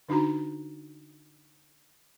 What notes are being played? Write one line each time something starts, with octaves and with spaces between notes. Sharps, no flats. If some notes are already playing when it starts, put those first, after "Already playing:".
D3 D4 D#4 F#4 A#5